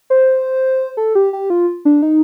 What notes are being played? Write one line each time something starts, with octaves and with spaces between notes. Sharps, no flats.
C5
A4
G4
G4
F4
D4
D#4